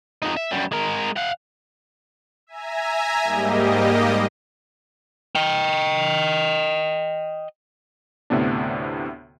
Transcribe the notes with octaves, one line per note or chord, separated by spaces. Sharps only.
F2 D#4
E5
F#2 G3
G#3 A#4
F5 F#5
E5 G#5 A#5
G#2 G3 A#3 G4 D#5
D#5 G5
D2 A2 C3 B3 D4